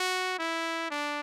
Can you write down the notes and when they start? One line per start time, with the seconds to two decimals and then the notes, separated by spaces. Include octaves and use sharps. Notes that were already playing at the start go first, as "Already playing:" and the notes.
Already playing: F#4
0.38 E4
0.91 D4